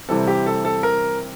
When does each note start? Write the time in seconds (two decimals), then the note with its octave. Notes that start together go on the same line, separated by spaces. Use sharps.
0.09 C3 E3 G3 C4 A4
0.27 G4
0.46 A4
0.65 A4
0.83 A#4